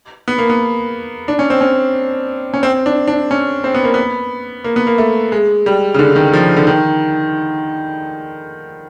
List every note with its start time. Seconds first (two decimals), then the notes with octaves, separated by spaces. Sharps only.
0.28 B3
0.38 A#3
0.50 B3
1.28 D4
1.39 C#4
1.50 C4
1.61 C#4
2.54 C#4
2.63 C4
2.86 D4
3.08 D4
3.31 C#4
3.64 C4
3.75 B3
3.84 A#3
3.94 B3
4.64 A#3
4.76 B3
4.87 A#3
4.98 A3
5.32 G#3
5.66 G3
5.94 C#3
5.99 D3
6.16 D#3
6.33 F3
6.57 D3
6.67 D#3